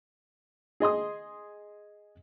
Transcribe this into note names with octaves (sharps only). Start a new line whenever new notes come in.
G#4 D#5 C6 D#6